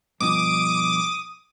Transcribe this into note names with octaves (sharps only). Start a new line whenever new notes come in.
G2 B2 F3 D6 D#6